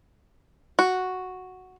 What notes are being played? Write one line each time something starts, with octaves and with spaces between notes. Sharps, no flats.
F#4